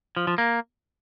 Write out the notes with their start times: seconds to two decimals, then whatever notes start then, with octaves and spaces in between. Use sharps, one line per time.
0.17 F3
0.27 F3
0.38 A#3